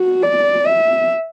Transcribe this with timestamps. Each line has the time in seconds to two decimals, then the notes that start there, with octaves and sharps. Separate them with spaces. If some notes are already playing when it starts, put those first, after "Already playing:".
Already playing: F#4
0.23 D5
0.66 E5